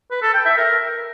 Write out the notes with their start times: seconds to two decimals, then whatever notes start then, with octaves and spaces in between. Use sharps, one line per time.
0.11 B4
0.23 A4
0.34 G5
0.46 E5
0.57 A#4